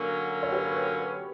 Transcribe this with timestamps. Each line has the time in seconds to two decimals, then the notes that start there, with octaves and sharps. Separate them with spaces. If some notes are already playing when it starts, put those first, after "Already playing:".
Already playing: D3 F#3 A#3 C#4 F#4 A#4
0.43 C#5
0.52 G4 B4